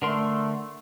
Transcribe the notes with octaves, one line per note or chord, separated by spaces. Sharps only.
D3 A3 A#4 C6